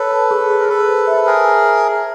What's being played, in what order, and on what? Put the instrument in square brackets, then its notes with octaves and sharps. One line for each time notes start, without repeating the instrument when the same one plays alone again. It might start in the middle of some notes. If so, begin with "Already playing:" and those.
Already playing: [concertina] A4 B4 [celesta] C#5
[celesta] A5
G#4
G#4
[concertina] A#4
[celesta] G#4 [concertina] A4 B4
[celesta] C5
E5
[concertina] A4
[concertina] G#4 A#4 [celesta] A5